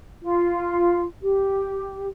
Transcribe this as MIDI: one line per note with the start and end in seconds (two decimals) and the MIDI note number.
0.22 1.04 65
1.22 2.06 67